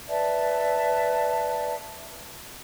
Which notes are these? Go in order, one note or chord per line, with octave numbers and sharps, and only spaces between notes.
B4 D5 E5 A5